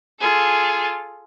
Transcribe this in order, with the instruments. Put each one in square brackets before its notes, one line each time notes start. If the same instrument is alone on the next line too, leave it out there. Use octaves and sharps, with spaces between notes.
[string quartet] F4 G#4 A4